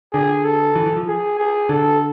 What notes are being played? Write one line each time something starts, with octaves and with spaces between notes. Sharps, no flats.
D3 G#4
A4
E3
E3
F3
G#4
G#4
D3 A4